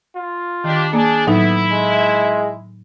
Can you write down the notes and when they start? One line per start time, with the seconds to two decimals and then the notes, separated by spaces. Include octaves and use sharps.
0.16 F4
0.64 D#3 D4 G4
0.93 A#3 D4 G#4
1.27 A2 F#3 B3 D#4 E4
1.71 G#3